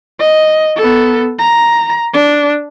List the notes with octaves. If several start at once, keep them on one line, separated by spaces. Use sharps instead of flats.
D#5
B3 A4
A#5
D4